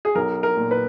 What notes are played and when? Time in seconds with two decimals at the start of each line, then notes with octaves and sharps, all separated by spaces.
0.05 G#4
0.15 B1 A#4
0.43 A#4
0.57 A#2
0.71 B4